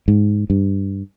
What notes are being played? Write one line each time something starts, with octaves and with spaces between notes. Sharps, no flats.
G#2
G2